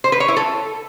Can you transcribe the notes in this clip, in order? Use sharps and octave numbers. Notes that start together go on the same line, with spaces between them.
C5
B4
C#5
E4
A4